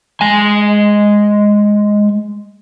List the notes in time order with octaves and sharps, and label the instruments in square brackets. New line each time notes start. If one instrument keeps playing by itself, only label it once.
[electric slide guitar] G#3 G#5